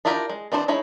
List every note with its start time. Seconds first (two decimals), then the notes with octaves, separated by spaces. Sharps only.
0.05 D4 E4 F4 G4 A#4
0.29 G#3
0.52 E3 C4 D4 F#4 C5
0.68 G#3 D#4 E4 C#5